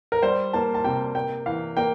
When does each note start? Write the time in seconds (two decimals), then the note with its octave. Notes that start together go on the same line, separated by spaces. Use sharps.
0.12 A#4
0.23 G3 C5
0.53 A#3 A5
0.75 A5
0.84 C3 G5
1.15 A#3 G5
1.46 E3 F5
1.77 A#3 G5